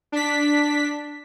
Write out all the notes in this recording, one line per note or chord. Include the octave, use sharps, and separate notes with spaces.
D4 B6